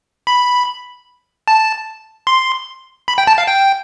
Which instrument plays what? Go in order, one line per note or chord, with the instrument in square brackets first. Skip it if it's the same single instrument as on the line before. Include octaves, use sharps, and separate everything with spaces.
[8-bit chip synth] B5
A5
C6
B5
G5
A5
F5
G5